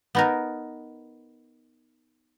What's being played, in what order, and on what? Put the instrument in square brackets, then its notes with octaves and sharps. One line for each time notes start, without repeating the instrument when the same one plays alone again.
[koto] B3 D#4 A#4